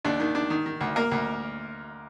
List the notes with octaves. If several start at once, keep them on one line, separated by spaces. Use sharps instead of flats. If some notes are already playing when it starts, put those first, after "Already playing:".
D#2 D4 D5
D#3
D4
D#3
D#3
D2
A#3 A#4
D2